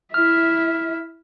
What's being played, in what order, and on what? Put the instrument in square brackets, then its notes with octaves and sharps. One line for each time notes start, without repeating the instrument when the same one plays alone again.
[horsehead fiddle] E4 E5 [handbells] F6